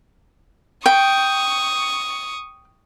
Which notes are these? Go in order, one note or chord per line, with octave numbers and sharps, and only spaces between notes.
G5 C#6 D#6